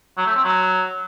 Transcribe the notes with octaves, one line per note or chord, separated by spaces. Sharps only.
F#3
A3
C4
F#3